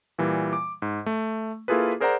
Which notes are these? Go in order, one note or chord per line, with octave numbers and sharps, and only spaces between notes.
A#2 E3 G3
D6
G#2
A3
A#3 E4 F4 G#4 A4 B4
G#4 A#4 C5 D5 F#5 A#5